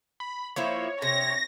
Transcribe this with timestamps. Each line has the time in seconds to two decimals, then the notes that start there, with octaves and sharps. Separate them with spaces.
0.20 B5
0.56 F3 A#3 E4 C#5
1.02 C3 A#6